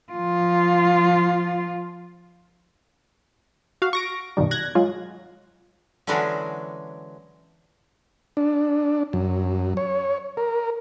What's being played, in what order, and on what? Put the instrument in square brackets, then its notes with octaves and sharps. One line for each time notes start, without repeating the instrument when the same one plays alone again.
[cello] F3 F4
[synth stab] F#4 F5
C#6 A#6 D7
G2 B2 D#3 G3
F#6 G#6 A#6
F#3 G#3 F4
[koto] D3 E3 F#3 G#3 C#4 D4
[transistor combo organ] D4
F#2
C#5
A#4